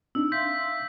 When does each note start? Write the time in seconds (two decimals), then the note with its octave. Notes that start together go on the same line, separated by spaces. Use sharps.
0.15 C4 D4 D#4 E6
0.32 E5 F5 C6 G6 B6